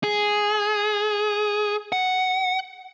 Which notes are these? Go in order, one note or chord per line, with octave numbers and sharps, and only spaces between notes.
G#4
F#5